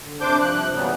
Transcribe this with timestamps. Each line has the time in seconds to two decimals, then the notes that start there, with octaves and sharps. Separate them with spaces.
0.02 D3
0.21 G2 C3 D4 C5 D6 G6
0.41 G2 C3 F3 F#6
0.75 A#2 C#3 E3 F#3 G3 B3